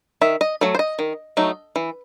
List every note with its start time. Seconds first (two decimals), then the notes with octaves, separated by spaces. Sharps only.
0.21 D#3 E5
0.41 D#5
0.61 F#3 A3
0.75 C5
0.79 D#5
0.99 D#3
1.37 F#3 A3 D#4
1.76 E3